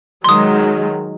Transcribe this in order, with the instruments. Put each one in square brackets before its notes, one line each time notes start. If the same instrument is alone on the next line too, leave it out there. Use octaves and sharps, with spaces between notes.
[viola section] D#3 F#3 G#3 [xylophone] C6 D#6